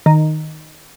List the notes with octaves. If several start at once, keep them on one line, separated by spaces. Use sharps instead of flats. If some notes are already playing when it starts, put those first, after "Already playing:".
D#3